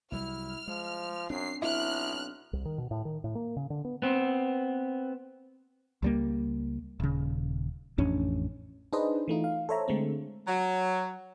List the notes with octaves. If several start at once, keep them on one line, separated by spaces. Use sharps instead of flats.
C2 F#3 G3 E4 F6
F3 G#3
F#2 C4 D4 C7
B1 E4 F6 F#6
C2
D#3
B2
A2
D#3
A2
A#3
C#3
D3
B3
B3 C4
C#2 G3 A#3
D#1 C#3
A1 F2 C#4 D4
D4 D#4 G#4 B4 C5 D#5
E3 A3 D#4 F4
F5
A4 C5 C#5 E5 A#5
D3 G#3 A3 C4
F#3